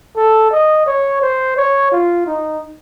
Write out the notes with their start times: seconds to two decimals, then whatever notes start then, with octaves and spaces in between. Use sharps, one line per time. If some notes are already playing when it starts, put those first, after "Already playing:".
0.16 A4
0.51 D#5
0.86 C#5
1.22 C5
1.57 C#5
1.92 F4
2.26 D#4